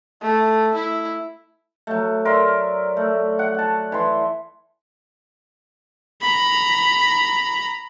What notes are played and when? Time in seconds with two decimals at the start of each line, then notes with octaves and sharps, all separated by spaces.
0.21 A3
0.75 E4
1.87 F#3 A3
2.25 A#4 D5 E5 C6
2.97 A3
3.39 F#5
3.54 F#5 A5
3.92 E3 C6
6.21 A#5 B5